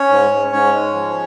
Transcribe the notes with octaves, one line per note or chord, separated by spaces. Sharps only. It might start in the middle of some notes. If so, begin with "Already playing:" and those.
Already playing: C#4 C#5
G#2
G#2
G#2 C#4 C#5
G#3
F3